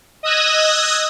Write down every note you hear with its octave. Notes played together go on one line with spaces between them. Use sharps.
D#5 D#6 E6 F#6 G#6 A#6